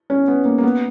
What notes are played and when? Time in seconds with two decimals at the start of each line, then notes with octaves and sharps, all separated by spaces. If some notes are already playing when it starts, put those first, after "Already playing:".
0.10 C#4
0.28 B3
0.45 A#3
0.58 A#3
0.63 B3